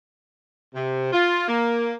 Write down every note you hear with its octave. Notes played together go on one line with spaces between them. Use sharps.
C3
F4
A#3